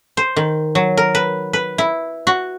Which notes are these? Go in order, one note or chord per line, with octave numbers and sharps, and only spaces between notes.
C5
D#3
F#3
A#4
B4
B4
E4
F#4